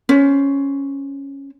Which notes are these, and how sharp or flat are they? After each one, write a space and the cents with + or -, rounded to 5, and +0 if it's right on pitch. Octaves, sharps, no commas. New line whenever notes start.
C#4 +0 C5 +0